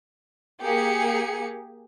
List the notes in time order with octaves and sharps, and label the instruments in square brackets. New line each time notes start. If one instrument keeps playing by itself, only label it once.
[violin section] A#3 G4 G#4 C#7